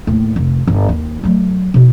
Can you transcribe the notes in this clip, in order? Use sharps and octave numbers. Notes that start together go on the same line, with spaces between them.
D#2 A2
F1
G1 G#2
D#2
F#3 A3
B2 D#4